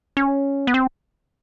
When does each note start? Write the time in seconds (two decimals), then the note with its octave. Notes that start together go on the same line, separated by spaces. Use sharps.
0.17 C#4
0.67 B3
0.74 C4